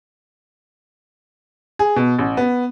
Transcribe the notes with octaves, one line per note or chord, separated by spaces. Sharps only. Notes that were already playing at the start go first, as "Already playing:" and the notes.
G#4
B2
A1
B3